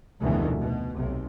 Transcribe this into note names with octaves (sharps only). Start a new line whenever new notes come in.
F1 D2 B2 D#3 E3
B2
B1 C3